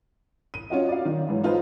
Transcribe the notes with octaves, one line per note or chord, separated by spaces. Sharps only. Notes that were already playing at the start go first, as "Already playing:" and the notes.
D#7
C#4 F4 F#4 D#5
D5 F5
D#3
G#2 E3 F#3
D#4 F4 A4 B4 C5